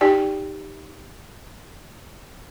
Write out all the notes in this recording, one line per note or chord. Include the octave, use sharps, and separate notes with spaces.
D#4 G4 D5 G5 G#5